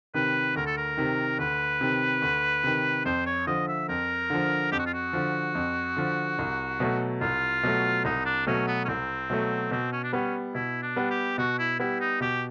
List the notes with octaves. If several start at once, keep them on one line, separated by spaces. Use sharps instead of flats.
C3 D#3 B4
D2 A#4
A4
A#4
C3 D#3
D2 B4
C3 D#3
D2
C3 D#3
F2 C5
C#5
D3 F3 D#5
E5
F2 A#4
D3 F3
F2 G4
F#4
F4
F#4
D3 F3
F2
D3 F3
C2
B2 F#3 A3
C2 F4
B2 F#3 A3
C2 D#4
D4
B2 F#3 A3 C#4
B3
C#4
C2 C4
B2 F#3 A3
B2 C4
C#4
D4
G3 B3 C#4
B2 E4
D4
G3 B3
G4
B2 F#4
E4
G3 B3 E4
D#4
B2 G4